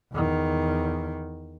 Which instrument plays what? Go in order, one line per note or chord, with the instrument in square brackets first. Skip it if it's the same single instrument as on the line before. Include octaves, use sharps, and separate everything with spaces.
[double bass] E2 D#3